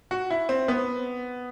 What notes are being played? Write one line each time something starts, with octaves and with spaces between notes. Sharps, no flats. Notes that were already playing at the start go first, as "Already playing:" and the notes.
F#4
E4
C4
B3